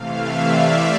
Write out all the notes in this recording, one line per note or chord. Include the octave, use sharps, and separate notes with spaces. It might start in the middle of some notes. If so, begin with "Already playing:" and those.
Already playing: C3 E3 A3 F5
E5
D5